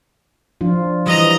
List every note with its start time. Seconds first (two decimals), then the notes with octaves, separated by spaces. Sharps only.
0.61 F3 D4 F4
1.06 E3 G3 D#5 A#5